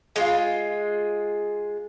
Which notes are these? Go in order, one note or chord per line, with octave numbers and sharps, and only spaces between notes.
G#3 F4